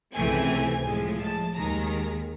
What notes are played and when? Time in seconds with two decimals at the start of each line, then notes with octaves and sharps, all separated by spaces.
0.13 C#2 C3 E3 A3 C4 G#5
0.84 A2 F3 G#3
1.20 A5
1.55 D#2 D#3 G#3 A#5